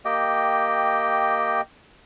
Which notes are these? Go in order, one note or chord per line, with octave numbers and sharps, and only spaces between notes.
A#3 G4 D#5 G5